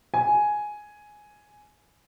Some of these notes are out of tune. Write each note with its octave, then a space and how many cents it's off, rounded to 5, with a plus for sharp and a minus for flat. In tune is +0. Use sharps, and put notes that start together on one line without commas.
G#5 +5